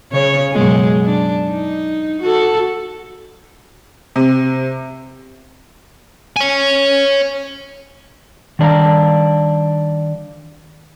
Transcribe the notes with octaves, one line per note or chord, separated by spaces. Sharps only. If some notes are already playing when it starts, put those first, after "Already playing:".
C#3 C#5
F#2 B2 G#3
D4
D#4
F#4 A4
C3
C#5 G#5
D#3 G3 D4 C5 F5 A#5